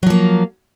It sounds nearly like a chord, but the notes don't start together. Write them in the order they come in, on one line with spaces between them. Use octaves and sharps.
F#3 F3 A#3